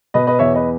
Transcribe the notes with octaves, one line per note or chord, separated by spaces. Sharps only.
B2 B4 D#5
B4 D#5
E2 C#5 E5
B4 D#5